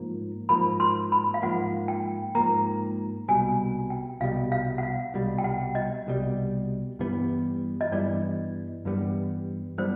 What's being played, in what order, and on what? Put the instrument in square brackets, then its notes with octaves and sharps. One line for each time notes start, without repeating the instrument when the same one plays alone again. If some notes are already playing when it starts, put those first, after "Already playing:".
Already playing: [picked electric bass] G#2 F3 A#3
[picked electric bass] G#2 F3 A#3 [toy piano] B5
[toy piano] C6
B5
F5
[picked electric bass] G#2 F3 A#3 [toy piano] F#5
[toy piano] G5
[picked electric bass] G#2 F3 A#3 [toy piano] A#5
[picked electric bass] C2 B2 G3 [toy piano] G#5
[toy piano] G5
[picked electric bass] C2 B2 G3 [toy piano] F5
[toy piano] F5
F#5
F5
[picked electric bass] C2 B2 G3
[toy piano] G5
F#5
D#5
[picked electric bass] C2 B2 G3
G2 E3 G3 B3
[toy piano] D#5
[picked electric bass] G2 E3 G3 B3 [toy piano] D5
[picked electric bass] G2 E3 G3 B3
[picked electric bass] E3 G3 B3 [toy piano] C5